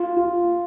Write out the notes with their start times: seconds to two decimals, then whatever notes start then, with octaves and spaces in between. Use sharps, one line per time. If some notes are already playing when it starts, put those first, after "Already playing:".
Already playing: F4
0.17 F4